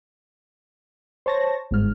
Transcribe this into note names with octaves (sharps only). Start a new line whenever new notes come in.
C5 C#5 A5 C#6 A#6
G1 G#2 F6